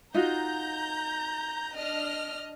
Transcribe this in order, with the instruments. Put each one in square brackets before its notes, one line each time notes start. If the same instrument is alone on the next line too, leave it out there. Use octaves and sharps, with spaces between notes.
[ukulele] D#4 F4 F#4 [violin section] A#5 G6
[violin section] D4 D#5 F6